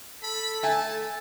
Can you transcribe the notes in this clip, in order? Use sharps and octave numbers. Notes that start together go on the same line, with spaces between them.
A4 B5
A3 G#5 A5